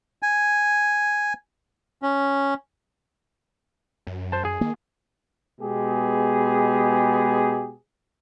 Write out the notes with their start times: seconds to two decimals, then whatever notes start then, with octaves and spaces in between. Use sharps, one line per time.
0.22 G#5
2.02 C#4
4.07 F#2
4.32 C5 A5
4.45 G#4
4.61 D#3 A#3
5.61 B2 G#3 B3 G4 G#4